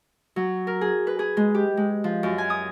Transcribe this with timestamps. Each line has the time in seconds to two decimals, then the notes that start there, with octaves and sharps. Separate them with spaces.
0.36 F#3
0.67 A#4
0.81 G#4
1.07 B4
1.19 G#4
1.37 G#3
1.55 G4
1.77 G#3
2.04 F3
2.23 F#2
2.38 G#5
2.50 D#6